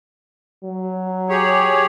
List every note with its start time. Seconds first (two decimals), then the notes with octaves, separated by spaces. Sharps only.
0.64 F#3
1.29 G4 G#4 C#5